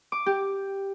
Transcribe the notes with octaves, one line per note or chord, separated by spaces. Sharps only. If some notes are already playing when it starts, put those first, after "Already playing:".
D6
G4